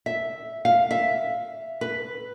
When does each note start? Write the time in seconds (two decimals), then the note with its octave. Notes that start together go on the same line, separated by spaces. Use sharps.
0.06 E5
0.65 F5
0.91 E5
1.81 B4